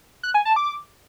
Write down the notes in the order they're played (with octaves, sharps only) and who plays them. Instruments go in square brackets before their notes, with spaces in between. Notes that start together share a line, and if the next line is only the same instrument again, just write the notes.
[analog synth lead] F#6
G#5
A5
D6